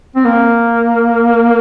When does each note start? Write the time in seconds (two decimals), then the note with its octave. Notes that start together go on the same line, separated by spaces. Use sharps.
0.16 C4
0.25 A#3